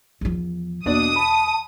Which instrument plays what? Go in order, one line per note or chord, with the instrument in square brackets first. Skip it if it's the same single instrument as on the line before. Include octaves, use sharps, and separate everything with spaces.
[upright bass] E2 F3
[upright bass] E2 [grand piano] B2 D4 D5 [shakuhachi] A#3 [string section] D#6
[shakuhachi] A5 [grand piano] B5